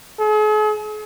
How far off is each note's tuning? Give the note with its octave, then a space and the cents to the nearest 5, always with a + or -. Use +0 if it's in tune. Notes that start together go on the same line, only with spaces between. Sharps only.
G#4 +45